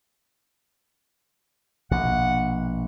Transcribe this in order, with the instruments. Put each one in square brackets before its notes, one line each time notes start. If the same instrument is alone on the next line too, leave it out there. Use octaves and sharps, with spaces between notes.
[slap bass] A#1 B2 [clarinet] F#5